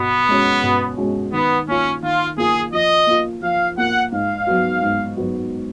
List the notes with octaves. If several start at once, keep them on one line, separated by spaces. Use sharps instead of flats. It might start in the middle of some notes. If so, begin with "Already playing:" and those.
Already playing: B2 B3
G#3 C#4 F#4
B2
G#3 C#4 F#4
D#3 B3
A#3 C#4 F4
D#3 F4
A#3 F4 G#4
F3 D#5
A#3 F4
F3 F5
A#3 F4 F#5
G#2 F5
F#3 B3 F#4
G#2
F#3 B3 F#4